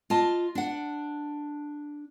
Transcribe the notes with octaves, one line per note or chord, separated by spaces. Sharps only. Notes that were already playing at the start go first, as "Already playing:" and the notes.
F4 D#5 A5
D4 F#5